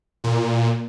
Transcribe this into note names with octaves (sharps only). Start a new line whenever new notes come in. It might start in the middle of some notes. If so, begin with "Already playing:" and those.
A#2